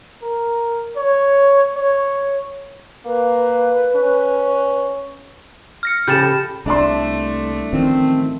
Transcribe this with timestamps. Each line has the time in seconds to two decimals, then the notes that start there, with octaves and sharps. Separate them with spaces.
0.22 A#4
0.97 C#5
1.76 C#5
3.06 A#3 B4
3.96 C#4
5.83 F6 A#6 C#7
6.07 A2 C#3 F3 G4 A4 G6 A6 E7
6.66 C2 A3 D4 D5 C6
7.73 A1 D#3 F3 C4